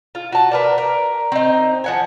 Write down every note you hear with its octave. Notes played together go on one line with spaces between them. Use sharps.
F4
F#4 A5
D4 A#4 B4
A#4
C4 D#4
F3 F#5 G#5